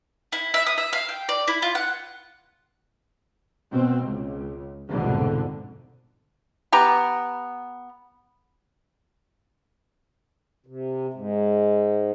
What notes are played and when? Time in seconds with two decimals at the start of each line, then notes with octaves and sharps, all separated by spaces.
0.32 E4
0.54 E5
0.66 D#6
0.78 E5
0.93 F5
1.09 G5
1.29 D5
1.48 E4
1.62 F4
1.75 F#5
3.70 B2 C4
4.03 C#2
4.89 C2 F2 G#2 B2 D3
6.72 B3 G4 A#5
10.66 C3
11.13 G#2